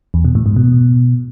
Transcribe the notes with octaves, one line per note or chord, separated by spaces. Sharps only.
E2
B2
A2
G#2
B2